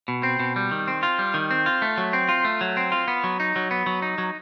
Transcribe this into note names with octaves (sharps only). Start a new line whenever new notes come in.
B2
C4
B2
G3
D#3
C4
F4
G3
D#3
C4
F4
A3
F#3
C4
F4
A3
F#3
C4
F4
B3
F#3
D#4
F#3
B3
F#3
D#4
F#3